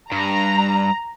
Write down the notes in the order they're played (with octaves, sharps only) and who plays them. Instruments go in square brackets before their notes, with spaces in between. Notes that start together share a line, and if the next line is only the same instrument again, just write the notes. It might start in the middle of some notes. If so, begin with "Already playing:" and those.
[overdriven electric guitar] G2 [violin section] A#5